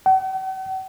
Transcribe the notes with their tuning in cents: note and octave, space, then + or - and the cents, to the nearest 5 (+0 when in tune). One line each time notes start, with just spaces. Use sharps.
F#5 +45